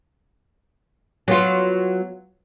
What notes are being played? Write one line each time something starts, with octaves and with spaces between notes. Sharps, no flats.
F#3 B3 F4